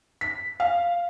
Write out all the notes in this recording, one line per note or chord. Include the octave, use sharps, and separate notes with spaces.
B6
F5